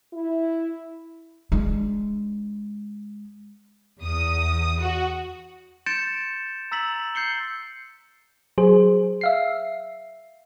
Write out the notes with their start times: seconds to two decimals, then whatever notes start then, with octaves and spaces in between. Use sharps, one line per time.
0.13 E4
1.52 G#3 D4
4.01 E2 D#6
4.80 F#4
5.86 C6 G6 A6 C#7 D7 E7
6.71 A#5 E6 A6 B6 F#7
7.15 G6 C7 C#7 G7
8.58 F#3 G#4 C5
9.21 E5 F5 C7